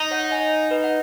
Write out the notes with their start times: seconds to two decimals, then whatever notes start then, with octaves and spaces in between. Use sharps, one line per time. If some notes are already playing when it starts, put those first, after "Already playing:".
Already playing: D#4
0.11 C#5 F#5
0.24 F#5
0.31 D#5 G#5
0.71 B4 D#5
0.84 F#5